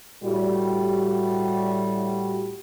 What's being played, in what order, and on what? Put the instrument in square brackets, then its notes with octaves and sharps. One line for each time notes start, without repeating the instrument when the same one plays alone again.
[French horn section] A2 G3 F#4